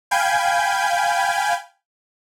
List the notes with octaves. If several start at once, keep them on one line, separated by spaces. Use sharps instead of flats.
F5 G5 G#5 B5 G6 G#6